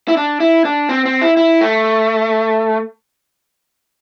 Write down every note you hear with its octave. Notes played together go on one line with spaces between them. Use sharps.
E4
D4
E4
D4
C4
C4
E4
E4
A3